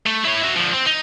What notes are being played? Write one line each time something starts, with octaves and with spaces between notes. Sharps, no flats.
A3
E4 C#5
F#4 E5
D3 F3
C4
D#4